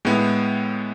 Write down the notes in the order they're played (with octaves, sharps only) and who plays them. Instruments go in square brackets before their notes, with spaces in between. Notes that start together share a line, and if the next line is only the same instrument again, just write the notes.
[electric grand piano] A2 G#3 B3 E4